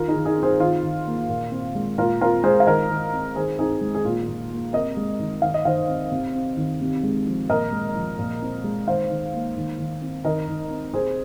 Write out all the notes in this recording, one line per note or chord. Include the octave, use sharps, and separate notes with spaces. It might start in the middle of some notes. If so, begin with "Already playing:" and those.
Already playing: D#3 F4 A#4
D#4 G#4
D#3
D#4 G#4
C4
G#4 C5
D#3 F4
D#3
A#3
A#2
C4
G#3
A#2 F4 A#4
C4 F4 A#4
G#3 G#4 C5
F5
D#3 A#4 D#5
D#3
C4
D#3 G#4 C5
C4 D#4 G#4
G#3
G#4
A#2 F4
A#2
A#3
C3 A#4 D#5
G#3
D#3
D#3 F5
D#5
D#3 C5 F5
C4
C3
C4
D#3
C3
G#3
F3
A#2 A#4 D#5
G#3
F3
A#2
C4
G#3
D#3 C5 F5
D#3
A#3
D#3
D#3
C4
D#3 A#4 D#5
D#3
C4
C3 G#4 C5